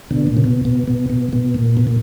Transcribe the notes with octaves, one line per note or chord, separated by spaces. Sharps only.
B2 D3
A#2
C#3
B2
B2
B2
B2
B2
A#2
B2
A#2